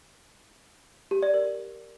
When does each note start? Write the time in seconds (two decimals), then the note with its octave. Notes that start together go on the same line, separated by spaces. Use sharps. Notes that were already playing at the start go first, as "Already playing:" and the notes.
1.11 G4
1.22 D5
1.34 A#4